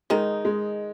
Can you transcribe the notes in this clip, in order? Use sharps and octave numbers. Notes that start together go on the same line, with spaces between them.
D#3 G#3 D#4
G#3